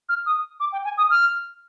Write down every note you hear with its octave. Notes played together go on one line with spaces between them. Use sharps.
F6
D#6
D6
G5
G#5
D#6
F6